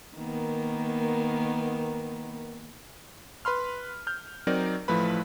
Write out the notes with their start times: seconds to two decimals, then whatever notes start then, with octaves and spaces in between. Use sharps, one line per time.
0.16 D#3 A#3 B3
3.45 B4 B5 C6 F6
4.07 F6 G6
4.47 F#3 C4 D#4 A#4 D5
4.88 A1 F3 A3 E4 B4 B5